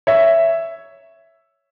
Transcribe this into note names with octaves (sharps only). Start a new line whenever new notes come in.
C#5 E5